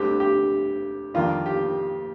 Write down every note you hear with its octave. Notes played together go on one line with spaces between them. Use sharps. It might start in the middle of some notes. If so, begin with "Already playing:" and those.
Already playing: D2 D3 G3 C4 G4
G4
F2 D#3 G3 A#3 D4 F4
G4